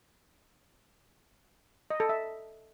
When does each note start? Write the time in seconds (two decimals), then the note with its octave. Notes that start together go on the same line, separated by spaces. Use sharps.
1.90 D#5
2.00 A4
2.09 E5